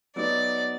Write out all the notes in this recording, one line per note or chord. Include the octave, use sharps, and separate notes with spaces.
F#3 B3 D#4 F#4 D5